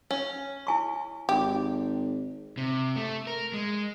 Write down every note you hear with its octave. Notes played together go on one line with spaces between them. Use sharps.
C#4
E4 G#5 C#6
G#1 G4
C3
A3
A#4
G#3